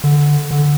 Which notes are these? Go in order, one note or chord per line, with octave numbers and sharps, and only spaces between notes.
D3
D3